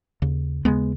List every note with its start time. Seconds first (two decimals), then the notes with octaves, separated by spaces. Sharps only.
0.22 D#2 C#3
0.65 D#2 C#3 G#3 B3